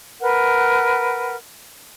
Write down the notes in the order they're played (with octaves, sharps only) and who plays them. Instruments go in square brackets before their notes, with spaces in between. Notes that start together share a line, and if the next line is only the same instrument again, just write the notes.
[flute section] A#4 B4 F#5